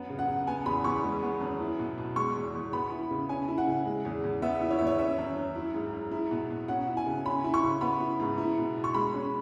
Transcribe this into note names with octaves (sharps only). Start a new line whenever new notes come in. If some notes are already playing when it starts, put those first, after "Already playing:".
Already playing: F#2 B3
C#3
F#5
C#3
B3 G#5
E2 B5
E2 C#6
G#3
B3
F#2
E4
B2
B2
G#3 C#6
E2
E2
B3 B5
E4
C#3
C#4 G#5
E4
F#5
C#3
G#3
E2
E2
B3 E5
E4
C#5
E2 E5
C#5
C#4 E5
F#2
F#2
E4
G#2
G#2
E4
B2
B2
C#4 F#5
E4
G#5
C#3
C#4 B5
E4
C#6
C#3
B3 B5
E4
G#2
E4
B2
B2
C#6
G#3 B5
C#4